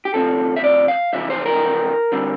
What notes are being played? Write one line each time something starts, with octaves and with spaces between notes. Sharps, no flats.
G4
D2 C3 F3 C4 A4
E5
D5
F5
F2 C3 E3 E5
C5
A#4
D3 G3 C4